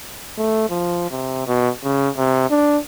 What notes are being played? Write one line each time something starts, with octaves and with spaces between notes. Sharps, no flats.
A3
F3
C3
B2
C#3
C3
D4